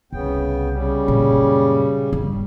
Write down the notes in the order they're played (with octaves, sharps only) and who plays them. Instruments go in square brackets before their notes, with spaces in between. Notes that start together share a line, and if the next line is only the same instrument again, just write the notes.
[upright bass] C2 [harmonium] C#3 B3 G5
[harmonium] C#3 G3
[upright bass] F#2 A#2
G2